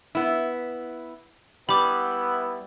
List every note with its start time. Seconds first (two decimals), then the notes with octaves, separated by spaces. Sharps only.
0.15 B3 E4
1.69 G3 B3 E4 B5 D6